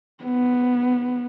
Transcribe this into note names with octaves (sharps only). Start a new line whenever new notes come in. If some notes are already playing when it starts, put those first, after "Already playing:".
B3